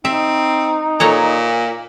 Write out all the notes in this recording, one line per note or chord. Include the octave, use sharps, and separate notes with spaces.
C4 D#4 E5
A#2 A4 C#5 A#5